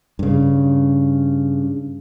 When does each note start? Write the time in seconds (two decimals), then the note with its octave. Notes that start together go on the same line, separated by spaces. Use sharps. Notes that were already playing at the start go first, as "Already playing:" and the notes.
0.19 G2 C#3